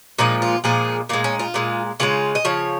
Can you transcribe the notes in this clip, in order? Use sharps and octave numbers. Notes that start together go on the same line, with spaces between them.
A#2 F3 G#3 D#4
F4
A#2 F3 G#3 G#4
A#2 G#3 A#3
C#4
F4
A#2 G#3
C#3 F3 G#3 F4
D#5
C#3 F3 C#5